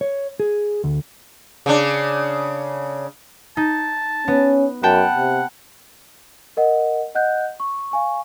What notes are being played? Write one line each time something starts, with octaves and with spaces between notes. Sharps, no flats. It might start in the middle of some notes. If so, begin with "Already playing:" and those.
C#5
G#4
D2
C#3 D4
D#4 A5
B3 C#4
F#2 F#5 G5 A5 B5
C3
A#4 D#5 F#5
D#5 F#5 F#6 G6
C#6
F5 G#5 C#6